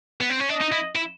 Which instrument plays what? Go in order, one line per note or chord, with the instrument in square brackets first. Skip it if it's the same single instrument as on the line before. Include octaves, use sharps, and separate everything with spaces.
[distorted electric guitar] B3
C4
C#4
[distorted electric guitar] D4 [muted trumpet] D#5
[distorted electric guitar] D#4
E4
E4